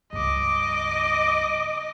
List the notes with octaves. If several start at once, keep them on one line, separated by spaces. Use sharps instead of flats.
C#2 G2 D#5 D6